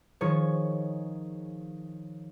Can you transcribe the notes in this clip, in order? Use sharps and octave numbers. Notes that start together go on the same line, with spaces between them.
D#3 F3 G#4 C#5